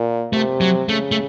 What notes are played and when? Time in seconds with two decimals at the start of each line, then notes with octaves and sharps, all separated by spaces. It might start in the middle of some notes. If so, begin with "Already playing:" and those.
Already playing: A#2
0.33 C3 A3
0.61 F#3
0.88 C#3 A3
1.12 A3